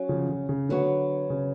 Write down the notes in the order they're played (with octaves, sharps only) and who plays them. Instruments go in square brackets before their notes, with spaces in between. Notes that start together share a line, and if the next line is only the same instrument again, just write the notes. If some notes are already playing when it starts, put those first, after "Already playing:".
Already playing: [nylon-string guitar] F#3 C#4 F#4
[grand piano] C#3 F3
C#3
C#3
[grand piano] D3 [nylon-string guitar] F#3 B3 F#4
[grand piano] C#3